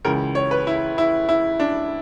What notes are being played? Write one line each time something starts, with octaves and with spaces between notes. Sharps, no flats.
C#2 C#3 E3 A#4
C#5
B4
E4
E4
E4
D4